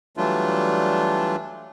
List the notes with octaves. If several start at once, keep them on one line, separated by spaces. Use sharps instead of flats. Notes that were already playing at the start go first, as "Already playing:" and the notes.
E3 F#3 G3 A3 D4 F4